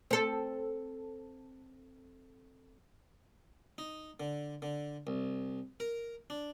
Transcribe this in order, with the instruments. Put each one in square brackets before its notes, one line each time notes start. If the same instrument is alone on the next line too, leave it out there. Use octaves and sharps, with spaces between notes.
[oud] C4 A4
[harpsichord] D#4
D3
D3
C2
A#4
D4